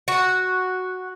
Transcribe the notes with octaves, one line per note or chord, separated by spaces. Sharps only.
F#4